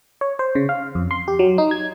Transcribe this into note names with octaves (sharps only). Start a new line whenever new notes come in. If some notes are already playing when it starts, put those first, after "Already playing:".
C#5
C5
C#3
F5
F2
C6
G4
F#3
D#4
G#6